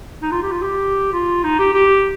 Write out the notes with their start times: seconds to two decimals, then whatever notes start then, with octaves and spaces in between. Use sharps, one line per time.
0.22 D#4
0.32 F4
0.42 G4
0.52 F4
0.62 G4
1.13 F4
1.43 D#4
1.59 G4
1.73 G4